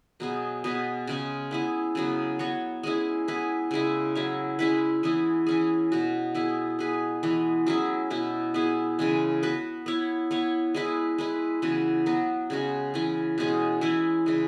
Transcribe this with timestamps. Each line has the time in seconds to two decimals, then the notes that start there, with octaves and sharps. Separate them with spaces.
0.20 B2 F#3 B3 G#4
0.64 B2 B3 G#4 B4
1.07 C#3 G#3 C#4
1.51 B3 E4 G#4
1.95 C#3 F#3 B3
2.39 B3 F#4 C#5
2.83 G#3 C#4 E4 G#4
3.28 B3 E4 G#4 B4
3.71 C#3 G#3 E4
4.15 F#3 E4 C#5
4.59 G#3 C#4 E4 B4
5.03 E3 B3 E4 G#4
5.47 E3 C#4 G#4
5.92 B2 B3 F#4
6.35 B3 E4 G#4
6.79 B3 G#4 B4
7.23 E3 G#3 B3
7.67 F#3 C#4 E4 G#4
8.10 B2 B3 E4
8.54 B3 E4 G#4
8.99 C#3 E3 G#3
9.43 B3 F#4 B4
9.86 B3 E4 C#5
10.31 B3 E4 C#5
10.74 G#3 E4 G#4 B4
11.18 G#3 E4 B4
11.62 C#3 E3 B3 F#4
12.06 F#3 B3 F#4
12.50 C#3 G#3 C#4 F#4
12.94 C#3 E3 C#4
13.38 B2 G#3 C#4 G#4
13.81 E3 G#3 C#4 E4
14.26 C#3 E3 G#3